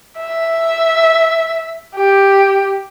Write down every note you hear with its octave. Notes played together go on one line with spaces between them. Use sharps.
E5
G4